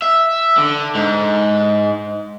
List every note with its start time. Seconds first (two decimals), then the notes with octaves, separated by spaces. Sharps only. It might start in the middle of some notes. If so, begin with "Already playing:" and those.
0.02 E5
0.58 D3
0.95 G#2